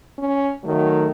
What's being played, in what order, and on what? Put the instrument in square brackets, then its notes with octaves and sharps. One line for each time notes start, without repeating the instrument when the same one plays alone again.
[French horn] C#4
[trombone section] D#3 A3 [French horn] F#3